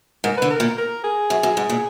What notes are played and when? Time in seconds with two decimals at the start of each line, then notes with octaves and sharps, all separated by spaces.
0.24 G#2 A#4
0.37 D3 B4
0.51 A#4
0.60 A#2
0.78 A#4
1.04 G#4
1.30 F#2
1.43 F#2
1.57 G#2
1.69 A#2